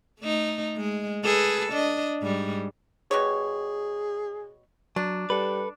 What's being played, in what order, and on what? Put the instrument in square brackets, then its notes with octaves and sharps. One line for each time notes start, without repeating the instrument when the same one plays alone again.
[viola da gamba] A3 D#4
G#3
G#4 A4 B4
D4 D#5
G#2 G3
[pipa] B2 G3 C#5 [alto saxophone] G#4
[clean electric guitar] F#3 [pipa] D4
[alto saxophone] G3 [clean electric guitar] A4 B4